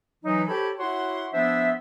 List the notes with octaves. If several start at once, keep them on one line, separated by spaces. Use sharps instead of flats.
E3 F#3 D#4
G4 A4 C5 C#5 A5 B5
E4 F#4 C#5 F#5 C6
F3 B3 D4 C5 E5